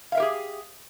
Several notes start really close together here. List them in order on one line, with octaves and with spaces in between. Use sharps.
F5 E5 A#4 G4 G#4